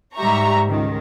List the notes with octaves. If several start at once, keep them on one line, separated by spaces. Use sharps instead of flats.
G#2 G3 G4 E5 A#5 C#6
C#2 D#3